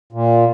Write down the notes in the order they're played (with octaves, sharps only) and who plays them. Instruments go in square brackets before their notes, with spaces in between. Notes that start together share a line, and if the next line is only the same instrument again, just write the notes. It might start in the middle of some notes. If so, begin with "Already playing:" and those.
[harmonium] A#2